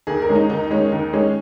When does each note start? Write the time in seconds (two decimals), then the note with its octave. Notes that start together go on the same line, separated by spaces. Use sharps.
0.07 D#2 G#4
0.22 A#4
0.29 D#3 G#3 C#4
0.35 D#4
0.50 D#2 D#4
0.70 D#3 G#3 C#4
0.92 D#2
1.13 D#3 G#3 C#4